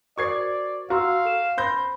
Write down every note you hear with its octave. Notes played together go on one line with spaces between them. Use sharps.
F#4 A#4 C5 D5 C#6 G#6 C7
F#4 F5 A#5 C6 E6
A4 E7
C5 B5 C6 G6 A#6